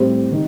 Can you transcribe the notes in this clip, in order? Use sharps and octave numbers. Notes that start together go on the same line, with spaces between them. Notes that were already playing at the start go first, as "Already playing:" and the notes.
Already playing: A2 G3 C4
D#3